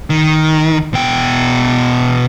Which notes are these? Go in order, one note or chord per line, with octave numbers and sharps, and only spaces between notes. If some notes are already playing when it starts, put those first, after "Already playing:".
D#3
B2 G5